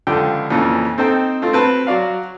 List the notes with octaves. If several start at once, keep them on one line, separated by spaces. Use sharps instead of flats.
C#2 D3 F3 G4 G5
F2 A#2 C#3 E3
C4 D#4 A4 C5 G5
A3 C4 F4
C4 F#4 B4 A5
F#3 F#4 D5 F5